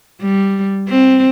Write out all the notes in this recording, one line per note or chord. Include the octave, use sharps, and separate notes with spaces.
G3
C4